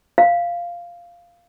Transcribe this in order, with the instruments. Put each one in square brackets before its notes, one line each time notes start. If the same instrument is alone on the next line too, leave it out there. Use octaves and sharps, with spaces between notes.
[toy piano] F5